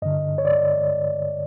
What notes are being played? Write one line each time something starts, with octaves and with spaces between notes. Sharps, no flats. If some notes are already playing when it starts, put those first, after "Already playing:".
G2 D3 D#5
C#5
D5